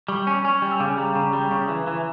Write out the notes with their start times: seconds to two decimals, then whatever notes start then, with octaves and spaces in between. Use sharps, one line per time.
0.08 G3 C#6
0.27 C#4
0.45 C#4
0.62 G3
0.72 E6
0.80 C#3 D6
0.98 G3 A#5
1.15 C#3 A#5
1.33 G3 A#5
1.51 C#3 C#6
1.68 E3
1.87 E3